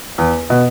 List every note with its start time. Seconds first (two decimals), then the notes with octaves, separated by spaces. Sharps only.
0.18 E2
0.50 B2